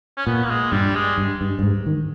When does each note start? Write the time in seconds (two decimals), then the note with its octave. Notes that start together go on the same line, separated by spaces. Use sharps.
0.17 C#4
0.26 A#2 B3
0.44 A#3
0.50 G#3
0.72 G2 G3
0.95 G#3
1.18 G2
1.41 G2
1.59 G2
1.63 G#2
1.86 D#3